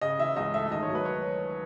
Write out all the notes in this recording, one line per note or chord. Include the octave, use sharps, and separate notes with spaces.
C#3 D#5
E3 E5
C#2 D#5
A3 E5
D#3 D#5
C#5
F#3
B4
C#5